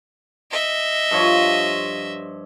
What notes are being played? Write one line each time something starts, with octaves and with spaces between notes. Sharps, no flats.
D#5 E5
G2 F3 C#5